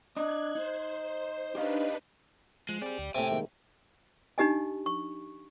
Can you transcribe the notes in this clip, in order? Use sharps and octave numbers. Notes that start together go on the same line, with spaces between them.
D4 D#5 F#6 G#6
D#4 C5
D4 D#4 G4 B4 D#5 F5
F3 G#3
C4 G4 G#4 D5
D2
A2 C3 G5 G#5 D#6 A6
D#3 G#3 A#3
D4 D#4 G4 D#5 G#5
C#6